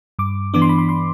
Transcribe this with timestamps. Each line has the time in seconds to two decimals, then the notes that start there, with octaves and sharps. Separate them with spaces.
0.19 G2 D6
0.54 E3 B3 D4 D6
0.62 C6
0.69 B5
0.78 C6
0.89 C6